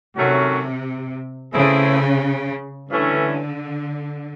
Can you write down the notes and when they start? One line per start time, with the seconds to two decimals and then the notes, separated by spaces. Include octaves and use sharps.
0.17 C3 D#3 F#3 A3 C#4 F#4
1.53 C#3 E3 A3 C4 E4 G#4
2.91 G2 D3 E3 A3 C#4